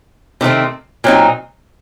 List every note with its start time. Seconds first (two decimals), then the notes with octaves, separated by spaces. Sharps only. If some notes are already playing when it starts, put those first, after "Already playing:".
0.41 C3 D#3 A3 C4
1.04 A#2 F#3 C4 D#4